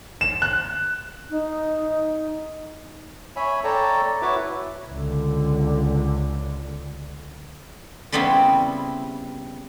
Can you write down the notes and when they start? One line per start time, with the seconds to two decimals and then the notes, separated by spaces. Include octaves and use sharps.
0.21 E7
0.42 F#6
1.30 D#4
3.36 C#5 E5 G#5 B5
3.64 A4 C#5 D5 G5 A5 A#5
4.22 E4 F#4 B4 C#5 E5 D6
4.91 C#2 D3
8.12 C#3 G3 B3 C4 E4